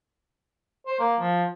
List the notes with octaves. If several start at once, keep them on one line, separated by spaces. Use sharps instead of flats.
C5
A#3
F3